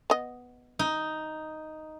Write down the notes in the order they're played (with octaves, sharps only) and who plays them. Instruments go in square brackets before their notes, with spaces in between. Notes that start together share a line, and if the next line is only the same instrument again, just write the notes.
[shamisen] B3 D#5
[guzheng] D#4